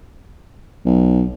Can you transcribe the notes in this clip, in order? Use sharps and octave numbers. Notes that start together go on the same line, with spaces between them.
B1